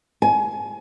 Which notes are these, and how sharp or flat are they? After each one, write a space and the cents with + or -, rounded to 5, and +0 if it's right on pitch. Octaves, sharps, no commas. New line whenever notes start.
G#5 +25